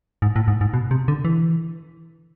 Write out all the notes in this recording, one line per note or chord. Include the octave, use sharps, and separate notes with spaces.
G#2
A2
G#2
G#2
B2
C3
D3
E3